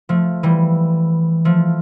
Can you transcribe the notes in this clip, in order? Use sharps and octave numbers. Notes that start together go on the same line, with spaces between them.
F3 A3
E3 G3
F3 A3